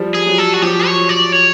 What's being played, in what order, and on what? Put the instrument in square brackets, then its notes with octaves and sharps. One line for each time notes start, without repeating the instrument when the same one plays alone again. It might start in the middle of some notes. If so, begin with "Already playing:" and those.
Already playing: [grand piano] F3 G3
[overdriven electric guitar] G#4
[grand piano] F#3
[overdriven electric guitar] A4
F#4
[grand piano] F3 [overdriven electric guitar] G4
[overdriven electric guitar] C#5
D5
C#5